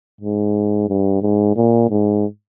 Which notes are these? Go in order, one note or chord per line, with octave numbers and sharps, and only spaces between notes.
G#2
G2
G#2
A#2
G#2